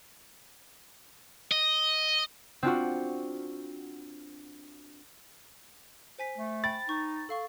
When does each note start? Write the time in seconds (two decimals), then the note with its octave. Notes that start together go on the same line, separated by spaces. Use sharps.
1.51 D#5
2.63 C4 D4 F4 F#4
6.19 C5 G#5 B6
6.38 A3
6.64 G5 B5 A6
6.89 D#4 C#6
7.29 A4 F5 C#6